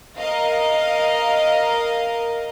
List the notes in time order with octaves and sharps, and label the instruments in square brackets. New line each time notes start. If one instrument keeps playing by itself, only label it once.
[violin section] A#4 D#5 F5